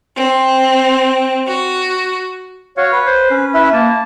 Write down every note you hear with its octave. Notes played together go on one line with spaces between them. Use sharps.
C4
F#4
F#4 C#5 F5
B4
C5
C#4
E4 B4 E5
A#3 A5